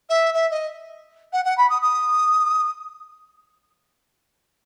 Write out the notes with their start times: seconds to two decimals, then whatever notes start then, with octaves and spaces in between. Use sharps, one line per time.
0.09 E5
0.34 E5
0.51 D#5
1.33 F#5
1.45 F#5
1.58 B5
1.70 D#6
1.82 D#6